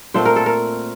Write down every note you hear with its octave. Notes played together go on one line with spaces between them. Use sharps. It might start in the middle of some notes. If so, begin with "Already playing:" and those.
A#2 A3 C4 C5
A#4
A4
A#4